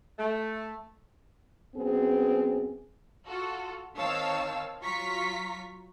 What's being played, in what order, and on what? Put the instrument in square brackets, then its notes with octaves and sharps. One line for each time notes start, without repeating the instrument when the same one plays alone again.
[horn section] A3
[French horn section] F#2 B3 C4 G#4
[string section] F4 F#4 A4
D#3 C4 C#5 F5 A5 E6
F#3 F4 A#5 C#6 B6